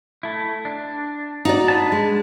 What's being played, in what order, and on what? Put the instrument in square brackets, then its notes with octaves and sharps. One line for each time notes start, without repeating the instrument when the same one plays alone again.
[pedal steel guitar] A3 E4
D4
[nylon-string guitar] D#4 F#4 D5
[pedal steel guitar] D4 B4 A5
[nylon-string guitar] G#3